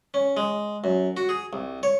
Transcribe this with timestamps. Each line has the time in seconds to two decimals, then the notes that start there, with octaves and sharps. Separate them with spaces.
0.14 C#4
0.37 G#3
0.84 F#2
1.17 F#4
1.29 G#4
1.53 C2
1.83 C#5